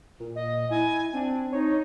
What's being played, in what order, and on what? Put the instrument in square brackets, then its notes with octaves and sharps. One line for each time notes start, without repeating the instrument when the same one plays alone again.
[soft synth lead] A#2
[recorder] D#5
[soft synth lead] E4 [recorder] G#5
[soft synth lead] C4 [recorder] D4
[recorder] D#4 [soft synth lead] C#5